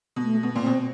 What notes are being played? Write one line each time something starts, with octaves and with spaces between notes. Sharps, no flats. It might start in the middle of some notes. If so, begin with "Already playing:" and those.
B2
A3
B2 B3
A#2 B3
B2 C4